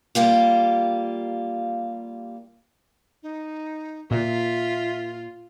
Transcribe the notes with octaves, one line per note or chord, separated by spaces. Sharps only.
G3 A#3 F4 G4
D#4
A#2 F4 E5